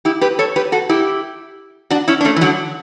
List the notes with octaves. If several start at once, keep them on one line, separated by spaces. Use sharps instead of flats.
E4 G4
G4 B4
A4 C#5
G4 B4
F#4 A4
E4 G4
D4 F#4
C#4 E4
D4
A3 C#4
E3
D3 F#3